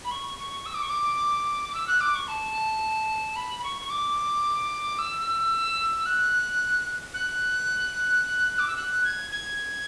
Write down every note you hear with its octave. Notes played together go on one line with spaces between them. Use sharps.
B5
C#6
C#6
E6
D6
C#6
D6
D6
E6
F#6
D6
C#6
A5
B5
B5
C#6
C#6
D6
E6
F#6
F#6
D6
E6
F#6
G#6
G#6